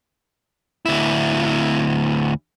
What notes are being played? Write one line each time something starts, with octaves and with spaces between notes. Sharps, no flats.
D2 E4